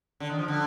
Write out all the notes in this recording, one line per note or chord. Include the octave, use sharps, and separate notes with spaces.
D3
D#3
F3
D3